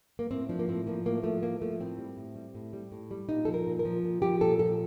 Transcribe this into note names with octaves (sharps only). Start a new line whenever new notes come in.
A#3
A2 C4
F3 D4
A#3
A2 C4
F3 A#3
A2 A#3
F3 A3
A2 A#3
F3 A3
A2 C4
G3
A2
G3
A2
G3
A2
G3
A#2 D#4
F3 A4
A#4
A#2
A#4
F3
A#2
F3 G4
A#2 A4
F3 A4